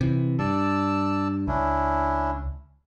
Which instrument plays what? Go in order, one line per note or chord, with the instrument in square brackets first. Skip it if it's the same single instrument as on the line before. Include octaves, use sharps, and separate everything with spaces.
[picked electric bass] C3 E3
[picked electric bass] G2 [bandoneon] D5 A5 E6
[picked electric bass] C#2 [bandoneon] C#4 D4 E4